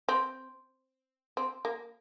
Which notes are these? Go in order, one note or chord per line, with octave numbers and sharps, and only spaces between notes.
C4
C4
A#3